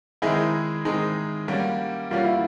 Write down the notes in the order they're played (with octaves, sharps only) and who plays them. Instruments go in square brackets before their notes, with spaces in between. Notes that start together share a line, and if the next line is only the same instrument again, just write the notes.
[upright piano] D#3 G#3 C4 D#4 G#4 [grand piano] E4
[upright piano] D#3 G#3 C4 D#4 G#4
G3 A#3 C#4 F#4
[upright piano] G3 A#3 C#4 F#4 [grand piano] F4
[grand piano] E4